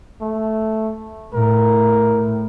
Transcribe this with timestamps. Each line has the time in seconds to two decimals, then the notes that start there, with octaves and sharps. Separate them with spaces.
0.21 A3
1.34 A2 A#4